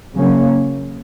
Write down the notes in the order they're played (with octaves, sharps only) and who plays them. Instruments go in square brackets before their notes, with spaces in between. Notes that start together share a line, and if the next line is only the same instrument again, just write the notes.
[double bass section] C#3 F#3 A#3 C#4